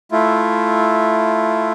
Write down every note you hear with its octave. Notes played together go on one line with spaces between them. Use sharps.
A3 E4 F4